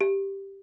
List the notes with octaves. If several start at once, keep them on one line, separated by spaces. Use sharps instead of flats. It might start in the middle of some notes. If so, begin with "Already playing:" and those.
G4